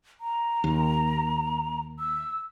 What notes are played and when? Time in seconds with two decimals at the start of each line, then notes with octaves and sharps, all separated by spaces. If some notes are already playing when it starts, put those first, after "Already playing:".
0.21 A#5
0.64 D#2
1.99 E6